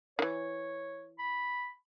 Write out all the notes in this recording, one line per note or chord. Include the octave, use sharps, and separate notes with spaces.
D#3 E3 C#5
B5